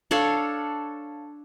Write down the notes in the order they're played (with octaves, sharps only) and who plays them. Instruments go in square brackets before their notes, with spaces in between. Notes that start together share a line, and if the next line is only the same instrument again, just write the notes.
[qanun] D4 A4 C#5 F5